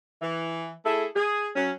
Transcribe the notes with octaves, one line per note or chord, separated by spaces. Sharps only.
E3
A3 E4 G#4 A4
G#4
F#3 C#4